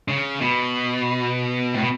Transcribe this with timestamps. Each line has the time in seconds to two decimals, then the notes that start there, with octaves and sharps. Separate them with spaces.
0.08 C#3
0.41 B2
1.74 A2
1.81 B2